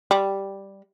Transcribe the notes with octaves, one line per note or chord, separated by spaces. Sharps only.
G3